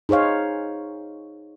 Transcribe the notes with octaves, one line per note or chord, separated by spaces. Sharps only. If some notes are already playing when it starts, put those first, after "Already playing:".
D#4 G#4 C5 C#5 F5